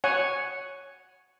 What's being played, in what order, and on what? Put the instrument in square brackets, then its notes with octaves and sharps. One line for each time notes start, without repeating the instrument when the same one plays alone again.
[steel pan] C#5 F#5 G#5